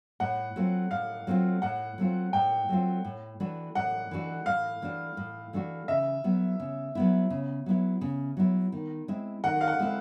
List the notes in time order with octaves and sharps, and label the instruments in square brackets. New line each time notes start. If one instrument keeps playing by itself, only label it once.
[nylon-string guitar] A2 [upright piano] F#5
[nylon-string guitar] F#3 A3 C4 F4
[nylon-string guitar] A2 [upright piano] F5
[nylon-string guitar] F#3 A3 C4 F4
[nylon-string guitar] A2 [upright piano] F#5
[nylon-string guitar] F#3 A3 C4 F4
[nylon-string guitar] A2 [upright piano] G5
[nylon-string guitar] F#3 A3 C4 F4
A2
E3 A3 D4 F#4
[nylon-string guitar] A2 [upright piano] F#5
[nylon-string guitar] E3 A3 D4 F#4
[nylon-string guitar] A2 [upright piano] F5
[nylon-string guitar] E3 A3 D4 F#4
A2
E3 A3 D4 F#4
[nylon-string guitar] C#3 [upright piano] E5
[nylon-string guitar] F#3 B3 E4
C#3
F#3 B3 E4
C#3
F#3 B3 E4
C#3
F#3 B3 E4
D#3
G#3 C4 E4
[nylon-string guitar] D#3 [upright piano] F#5
[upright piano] F5
F#5
[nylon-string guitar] G#3 C4 E4